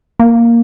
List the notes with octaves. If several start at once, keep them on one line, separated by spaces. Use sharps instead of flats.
A#3